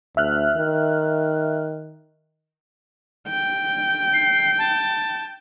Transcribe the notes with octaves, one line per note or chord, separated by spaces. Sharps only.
D2 E5 F6 F#6
D#3
G5
C7
A5